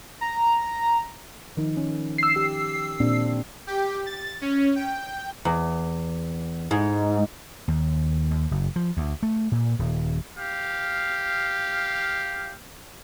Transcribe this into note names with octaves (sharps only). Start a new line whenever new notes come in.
A#5
D#3 F3 D#4
C#4
E6 C7
G4
A#2 C4 D4
G4
A6
C#4
G5
E2
G#2
D#2
D#2
F#1
F3
D2
A3
A#2
D#1
G4 F5